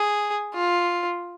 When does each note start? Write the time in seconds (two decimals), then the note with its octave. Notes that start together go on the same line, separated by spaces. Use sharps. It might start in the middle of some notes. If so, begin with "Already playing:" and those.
Already playing: G#4
0.55 F4